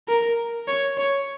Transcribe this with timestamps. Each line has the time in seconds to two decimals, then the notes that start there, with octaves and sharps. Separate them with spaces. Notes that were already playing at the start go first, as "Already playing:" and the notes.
0.09 A#4
0.68 C#5
0.98 C#5